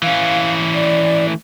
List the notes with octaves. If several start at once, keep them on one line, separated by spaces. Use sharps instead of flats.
E3 C#4 F5
D5
A3